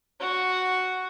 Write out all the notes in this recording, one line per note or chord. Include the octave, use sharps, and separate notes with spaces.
F#4